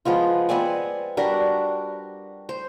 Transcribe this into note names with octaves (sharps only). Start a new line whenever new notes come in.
F3 G#3 B3 F4
B3 C4 D5 G#5
G3 D4 F#4 A#4
C5